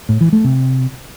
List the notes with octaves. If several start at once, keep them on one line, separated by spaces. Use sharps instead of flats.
A2
E3
A3
C3